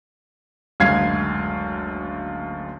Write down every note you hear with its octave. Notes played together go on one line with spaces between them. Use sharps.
F#1 D2 G#3 F5 G#6 C7